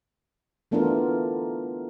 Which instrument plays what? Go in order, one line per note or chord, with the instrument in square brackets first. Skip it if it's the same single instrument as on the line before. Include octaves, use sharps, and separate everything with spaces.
[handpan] E3 A3 B3 D4 F4 A#4